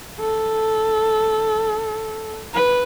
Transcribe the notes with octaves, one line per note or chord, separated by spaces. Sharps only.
A4
B4